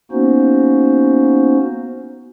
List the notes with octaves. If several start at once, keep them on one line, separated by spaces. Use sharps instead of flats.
A#3 B3 C#4 D#4 F#4 C5